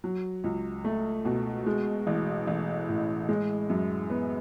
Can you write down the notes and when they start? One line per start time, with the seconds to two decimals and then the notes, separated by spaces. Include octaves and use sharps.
0.04 F#3
0.44 C#2
0.85 A3
1.25 B2
1.66 G#3
2.07 A1
2.47 A1
2.88 A2
3.29 G#3
3.70 F#2
4.10 B3